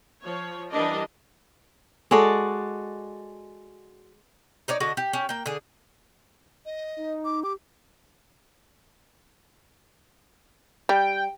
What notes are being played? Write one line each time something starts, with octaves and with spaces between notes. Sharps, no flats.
F3 C#5
E3 G3 D4 A#4 D5 D#5
G#3 F#4 A4 D5
D#4 C#5 D5
D3 D4 F#4 D#5
G4
C#4 G4
A#3 G5
D3 G#4
D#5
D#4
D6
G4 D6
G3 G5